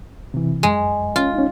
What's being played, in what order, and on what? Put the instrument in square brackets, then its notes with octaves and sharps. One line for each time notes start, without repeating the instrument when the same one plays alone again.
[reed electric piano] C3 E3
[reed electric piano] F#2 [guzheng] G#3
[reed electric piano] C#4 [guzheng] F4
[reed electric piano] C#4 D#4